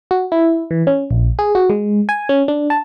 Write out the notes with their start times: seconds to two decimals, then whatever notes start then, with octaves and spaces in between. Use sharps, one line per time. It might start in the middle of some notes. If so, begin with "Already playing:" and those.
0.11 F#4
0.32 E4
0.71 E3
0.87 C#4
1.11 A#1
1.39 G#4
1.55 F#4
1.70 G#3
2.09 G#5
2.29 C#4
2.48 D4
2.70 A5